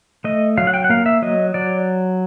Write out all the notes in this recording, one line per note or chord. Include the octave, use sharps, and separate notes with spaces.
A3 D#5
F#3 F5
F#5
G5
F#5
A#3 F5
E5
F#3 D#5
F#3 D5